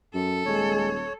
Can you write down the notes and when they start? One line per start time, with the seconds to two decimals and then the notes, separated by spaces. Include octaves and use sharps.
0.14 F#2 A4
0.45 D#1 G#3 C#5